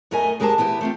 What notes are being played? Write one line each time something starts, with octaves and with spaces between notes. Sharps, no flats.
F#2 A3 A#4 D#5 G#5
F#2 G#3 G4 A#4 C5 A5
E3 B3 E4 G4
A3 C4 F4